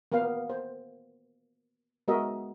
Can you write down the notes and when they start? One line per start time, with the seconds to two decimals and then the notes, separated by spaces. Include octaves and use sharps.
0.12 A#3 B3 B4 F5
0.50 C5
2.08 G#3 B3 F#4 A#4 D#5 E5